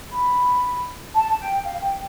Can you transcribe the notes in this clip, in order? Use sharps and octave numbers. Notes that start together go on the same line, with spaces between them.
B5
A5
G5
F5
G5